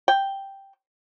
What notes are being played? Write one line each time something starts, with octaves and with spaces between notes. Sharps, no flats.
G5